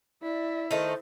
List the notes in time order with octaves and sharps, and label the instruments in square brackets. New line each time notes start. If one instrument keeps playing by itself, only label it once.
[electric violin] E4 E5 [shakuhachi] D5
[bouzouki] D#3 A3 D#4 [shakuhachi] C5